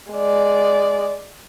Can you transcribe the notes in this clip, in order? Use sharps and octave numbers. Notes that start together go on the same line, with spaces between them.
G#3 D5